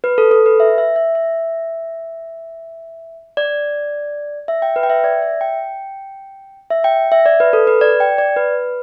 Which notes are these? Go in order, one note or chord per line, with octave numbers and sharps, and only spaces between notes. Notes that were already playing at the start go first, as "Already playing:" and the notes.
B4
A4
A4
B4
E5
E5
E5
E5
D5
E5
G5
B4
G5
E5
D5
E5
G5
E5
G5
E5
D5
B4
A4
B4
D5
G5
D5
B4